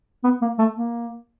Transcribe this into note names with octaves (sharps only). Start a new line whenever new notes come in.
B3
A#3
A3
A#3